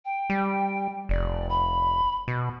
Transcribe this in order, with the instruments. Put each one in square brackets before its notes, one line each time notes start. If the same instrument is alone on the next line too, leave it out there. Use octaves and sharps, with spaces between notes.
[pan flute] G5
[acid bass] G3
[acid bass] F1 [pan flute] D5
[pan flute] B5
[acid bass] B2